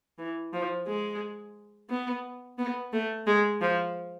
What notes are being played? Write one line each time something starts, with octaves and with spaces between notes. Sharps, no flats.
E3
F3
G#3
B3
B3
A3
G#3
F3